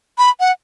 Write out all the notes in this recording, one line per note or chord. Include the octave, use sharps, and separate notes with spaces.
B5
F#5